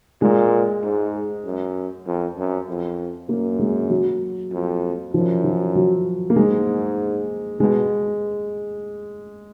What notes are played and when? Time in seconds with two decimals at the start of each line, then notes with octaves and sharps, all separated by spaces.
0.21 A#2 G#3
0.83 G#2
1.45 F#2
2.06 F2
2.37 F#2
2.68 F2
3.29 F#2 A#3
3.59 G#3
3.90 F#3
4.52 F2
5.14 F#2 F3
5.44 F3
5.75 F#3
6.30 A#3
6.36 G#2 G#3
7.60 B2 G#3